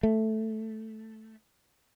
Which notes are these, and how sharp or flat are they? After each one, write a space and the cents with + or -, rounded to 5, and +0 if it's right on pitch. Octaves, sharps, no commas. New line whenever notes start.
A3 +0